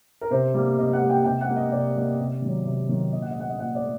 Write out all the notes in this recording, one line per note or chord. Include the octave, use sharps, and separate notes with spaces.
A#4
C3 C5
G3 A#3
C3 D#5
F#5
G3 A#3
G5
C3 G5
F#5
G3 A#3
D#5
C3 D5
G3 A#3
C3
D#3 F#3
C3
D#3 F#3
A#2 D#5
F#5
D#5
A3 F#5
D#5
A#2 F#5
D5
A3